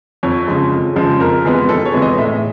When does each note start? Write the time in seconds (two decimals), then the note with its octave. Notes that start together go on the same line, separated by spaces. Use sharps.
0.23 F2 C#5
0.48 C#3 F3 G#3
0.72 F2
0.96 C#3 F3 G#3
1.20 F2 A#4
1.45 C3 E3 G#3 B3
1.69 F2 A4
1.85 C#5
1.94 C3 E3 G#3 B3
2.02 D#5
2.18 A2 E5